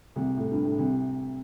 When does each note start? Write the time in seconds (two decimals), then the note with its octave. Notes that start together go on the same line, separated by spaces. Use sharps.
0.16 C2 C3
0.37 A2
0.51 G2
0.65 A2
0.78 C2 C3